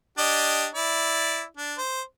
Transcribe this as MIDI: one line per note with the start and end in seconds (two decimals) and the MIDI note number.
0.18 0.66 62
0.18 0.66 67
0.18 0.66 75
0.75 1.42 64
0.75 1.42 74
1.57 1.75 62
1.78 2.02 72